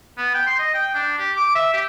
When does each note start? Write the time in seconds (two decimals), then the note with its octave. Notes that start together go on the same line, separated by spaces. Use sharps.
0.18 B3
0.34 G5
0.47 C6
0.59 D#5
0.74 G5
0.95 D4
1.18 G4
1.36 D6
1.55 E5
1.74 G4